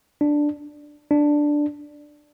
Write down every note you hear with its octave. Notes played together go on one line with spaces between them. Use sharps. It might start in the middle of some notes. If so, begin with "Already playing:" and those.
D4
D4